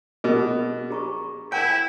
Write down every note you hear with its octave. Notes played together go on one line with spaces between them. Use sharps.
B2 G#4 A#4 D#5
G#4 A#5 C#6
E4 F#5 G5